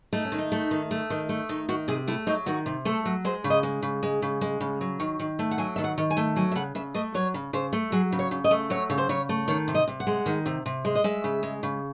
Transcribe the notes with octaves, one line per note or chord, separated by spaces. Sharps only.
A3 D#4
C#4
D#3
D#4
A3
D#3
A3
D#3
A3
D#3
D#3 F#4
C3 G#4
A3 E4
F#3 D#4
D#3 F#4
C3
A3 A4
F#3
G#3 C5
C#3
D#5
G#3
C#3
G#3
C#3
G#3
C#3
F#3
D#3
D#3
A3
F#5
F#3 G#5
D#3 E5
F#5
D#3
G#5
A3
F#3 G#5
E5
C#3 F#5
C#3 E5
A3 D#5
F#3 C#5
C#3
C#3 C5
A3
F#3 G#4
C#3
C#5
C#3
D#5
A3
F#3 C#5
C#3
C5
C#3 C#5
A3
D#3 C#5
C3
D#5
C3
F#5
G#3
D#3
C3
C3
G#3
D#5
G#3 E5
C#3
G#3
C#3